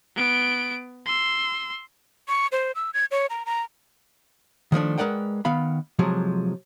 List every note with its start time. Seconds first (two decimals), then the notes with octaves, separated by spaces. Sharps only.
0.16 B3 D7
1.06 C6 E6
2.28 C#6
2.52 C5
2.75 E6
2.94 G#6
3.11 C#5
3.30 A#5
3.46 A#5
4.72 D#3 F3 A3 D4
4.98 G#3 A#4 B4 D5 F#5 G5
5.45 D#3 B3 F5 B5
5.99 C3 F3 F#3 G#3